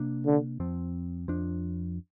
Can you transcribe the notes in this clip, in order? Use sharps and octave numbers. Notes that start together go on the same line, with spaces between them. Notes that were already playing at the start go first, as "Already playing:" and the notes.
Already playing: C3 A#3 D4
D3
F2 F3 C4
F2 F3 D4